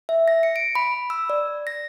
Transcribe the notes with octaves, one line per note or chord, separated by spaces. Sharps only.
E5
A#6
C#7
D7
B5
E6
D5
A#6